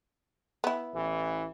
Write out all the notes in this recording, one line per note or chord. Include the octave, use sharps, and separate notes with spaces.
B3 E4
A1 E3